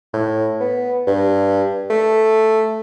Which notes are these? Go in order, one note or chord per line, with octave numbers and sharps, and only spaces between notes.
A2
B3
G2
A3